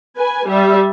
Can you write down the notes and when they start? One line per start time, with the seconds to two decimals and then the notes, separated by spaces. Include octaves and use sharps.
0.17 B4 G#5
0.47 G3 E5